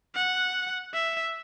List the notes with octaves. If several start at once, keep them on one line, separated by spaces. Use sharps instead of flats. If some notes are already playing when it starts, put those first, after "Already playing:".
F#5
E5